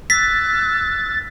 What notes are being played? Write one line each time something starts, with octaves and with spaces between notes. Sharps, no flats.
E6 F#6 A6 B6